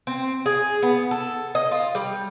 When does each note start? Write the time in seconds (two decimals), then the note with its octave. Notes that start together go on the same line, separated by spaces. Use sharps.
0.07 C4
0.46 G#4
0.83 B3
1.11 A4
1.55 D#5
1.71 F4
1.95 G3